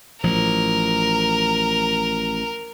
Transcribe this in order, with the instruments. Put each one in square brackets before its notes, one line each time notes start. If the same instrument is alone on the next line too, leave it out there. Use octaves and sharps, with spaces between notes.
[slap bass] A1 F3 [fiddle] A#4